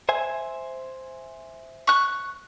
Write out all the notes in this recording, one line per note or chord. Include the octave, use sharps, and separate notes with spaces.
C5 E5 G#5
C#6 F#6